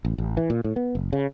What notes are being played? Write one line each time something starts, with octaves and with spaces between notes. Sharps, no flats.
A1
A1
E3
A#2
A2
B3
F#1
C#3